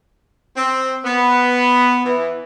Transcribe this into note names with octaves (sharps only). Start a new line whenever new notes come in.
C4
B3
E3